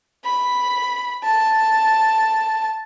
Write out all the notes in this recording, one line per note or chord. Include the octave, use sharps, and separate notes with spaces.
B5
A5